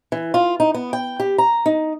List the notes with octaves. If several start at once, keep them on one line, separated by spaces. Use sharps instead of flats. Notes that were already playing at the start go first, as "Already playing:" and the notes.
E3
F4
D#4
B3
G5
G4
A#5
D#4